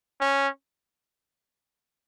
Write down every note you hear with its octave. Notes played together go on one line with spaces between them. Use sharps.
C#4